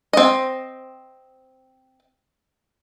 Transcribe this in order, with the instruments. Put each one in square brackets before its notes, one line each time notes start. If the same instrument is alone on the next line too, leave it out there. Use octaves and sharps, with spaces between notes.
[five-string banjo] C4 D#5